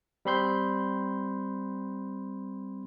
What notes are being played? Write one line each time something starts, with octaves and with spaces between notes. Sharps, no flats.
G3 C4 B5 C6 G6